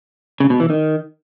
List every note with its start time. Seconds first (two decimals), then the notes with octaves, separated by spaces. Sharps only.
0.40 C#3
0.50 B2
0.60 E3
0.70 D#3